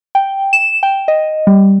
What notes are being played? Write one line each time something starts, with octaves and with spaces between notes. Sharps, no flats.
G5
E7
G5
D#5
G3